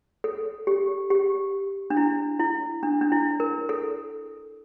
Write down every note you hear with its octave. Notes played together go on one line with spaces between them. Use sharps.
A4
G4
G4
D4
E4
E4
D4
D4
E4
A#4
A4